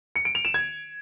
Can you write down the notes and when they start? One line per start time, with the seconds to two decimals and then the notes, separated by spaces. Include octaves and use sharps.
0.16 C#7
0.25 D7
0.35 F7
0.45 E7
0.54 G#6